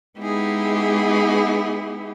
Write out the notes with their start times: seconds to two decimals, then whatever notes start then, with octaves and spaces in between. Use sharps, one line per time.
0.19 G#3 B3 D#4 E4 G4 G#4